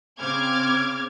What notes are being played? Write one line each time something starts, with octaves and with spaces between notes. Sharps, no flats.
C#3 C4 D6 F6 G#6